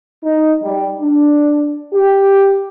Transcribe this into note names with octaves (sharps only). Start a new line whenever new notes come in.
D#4
G3
D4
G4